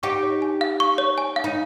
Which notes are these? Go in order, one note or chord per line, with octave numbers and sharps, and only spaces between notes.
D#4 G4 C#6
C#5
G#5
F5
C#6
C#5
G#5
F5
D#4